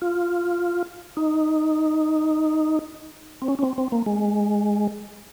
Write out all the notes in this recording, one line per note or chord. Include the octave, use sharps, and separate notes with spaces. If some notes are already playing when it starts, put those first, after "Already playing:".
F4
D#4
C4
C#4
C#4
C4
C4
A#3
G#3